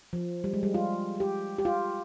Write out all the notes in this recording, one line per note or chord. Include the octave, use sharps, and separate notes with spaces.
F3
G3
G#3
G3
F4
G4
G4
F4